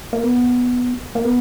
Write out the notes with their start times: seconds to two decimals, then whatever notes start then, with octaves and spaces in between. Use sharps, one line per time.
0.13 A#3
0.23 B3
1.15 A#3
1.24 B3